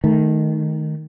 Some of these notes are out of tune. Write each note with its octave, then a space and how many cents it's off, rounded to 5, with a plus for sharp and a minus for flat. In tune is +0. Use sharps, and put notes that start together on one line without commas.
D#3 +0 A3 -20